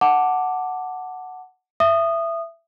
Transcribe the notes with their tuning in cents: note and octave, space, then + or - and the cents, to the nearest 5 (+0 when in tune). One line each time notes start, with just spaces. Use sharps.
F#5 +0 A5 +5 D6 +0
E5 +15 D#6 -20